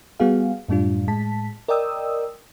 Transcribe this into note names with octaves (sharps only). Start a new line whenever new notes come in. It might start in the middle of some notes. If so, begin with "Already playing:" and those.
G3 B3 F#4 G#4 F5
F#2 A2 G3 D4 F4
A2 G#3 A5 B6
A#4 D5 D#5 G5 D#6 E6